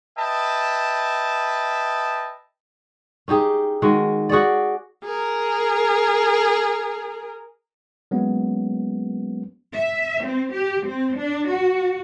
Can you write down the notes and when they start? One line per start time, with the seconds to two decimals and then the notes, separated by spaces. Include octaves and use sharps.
0.17 B4 D#5 E5 G5 A5
3.28 C#4 D#4 G4 G#4
3.82 D#3 G#3 F#4
4.29 F#4 G#4 C#5 D5
5.04 G#4 A#4
8.11 F#3 G#3 A#3 B3 C#4
9.74 E5
10.23 C4
10.53 G4
10.86 C4
11.16 D4
11.49 F#4